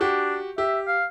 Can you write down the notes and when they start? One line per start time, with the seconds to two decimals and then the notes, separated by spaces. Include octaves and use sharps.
0.01 D4 F#4 G4
0.58 G4 E5
0.87 F5